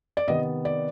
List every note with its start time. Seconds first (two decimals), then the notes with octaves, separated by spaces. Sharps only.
0.17 D5
0.28 C3 D#3 B3 D#5
0.65 D5